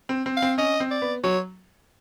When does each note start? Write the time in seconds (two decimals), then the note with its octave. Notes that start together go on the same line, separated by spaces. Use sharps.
0.09 C4
0.26 C4
0.37 F5
0.42 C4
0.58 C#4 D#5
0.80 C4
0.91 D5
1.02 B3
1.24 F#3 C#5